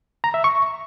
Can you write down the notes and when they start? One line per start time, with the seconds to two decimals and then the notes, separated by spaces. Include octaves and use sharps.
0.24 A#5
0.34 E5
0.44 C#6